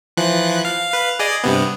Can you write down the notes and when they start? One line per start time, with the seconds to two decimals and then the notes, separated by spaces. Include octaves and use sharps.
0.17 E3 F3 F#6
0.65 F5
0.92 B4 F5
1.19 G#4 D5 D#5
1.44 G2 C3 B3